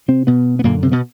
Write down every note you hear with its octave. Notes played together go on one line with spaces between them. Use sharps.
C3 C4
B2 B3
B3
F#2 A#2 D3 A#3
C3 C4
B2 B3